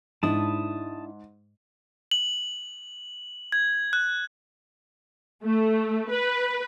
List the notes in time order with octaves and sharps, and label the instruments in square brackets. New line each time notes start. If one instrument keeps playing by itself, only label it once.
[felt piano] G#2 [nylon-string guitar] D4 E4 [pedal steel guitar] A5 D#6
[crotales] F#7
G#6
F#6
[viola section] A3
B4